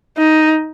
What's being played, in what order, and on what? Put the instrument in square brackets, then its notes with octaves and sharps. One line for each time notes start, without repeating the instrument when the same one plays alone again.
[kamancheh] D#4